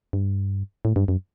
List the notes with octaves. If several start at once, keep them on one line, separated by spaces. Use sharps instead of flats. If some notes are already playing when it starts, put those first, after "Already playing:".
G2
A2
G2
F#2